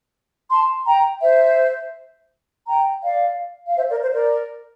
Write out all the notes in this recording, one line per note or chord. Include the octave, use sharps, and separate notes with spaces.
A5 C6
G5 A#5
C5 E5
G5 A#5
D5 F5
F5
C5 E5
A#4 D5
C5
A#4 D5